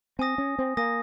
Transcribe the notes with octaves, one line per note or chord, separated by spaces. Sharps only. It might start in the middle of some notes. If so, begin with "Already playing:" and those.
C4 G#5 D#6 A#6
C#4
C4
A#3 G#5 D#6 A#6